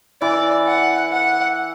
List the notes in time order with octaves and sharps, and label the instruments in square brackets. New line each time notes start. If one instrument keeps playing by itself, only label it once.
[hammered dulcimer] E3 [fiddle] D5
[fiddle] F#5
F#5